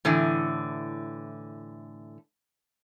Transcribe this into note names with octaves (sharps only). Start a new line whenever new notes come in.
A2 D3 E3